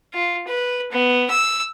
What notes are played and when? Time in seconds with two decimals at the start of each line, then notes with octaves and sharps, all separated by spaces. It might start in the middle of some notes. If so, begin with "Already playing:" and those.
0.14 F4
0.47 B4
0.92 B3
1.30 E6